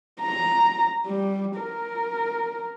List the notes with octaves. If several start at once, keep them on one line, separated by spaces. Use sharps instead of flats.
A#5
G3
A#4